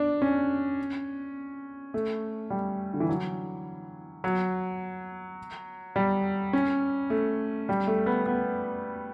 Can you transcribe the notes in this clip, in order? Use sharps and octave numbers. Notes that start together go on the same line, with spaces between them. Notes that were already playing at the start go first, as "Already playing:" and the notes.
Already playing: D4
C#4
A3
G3
D3
E3
F#3
F#3
G3
C#4
A3
G3
A3
B3
B3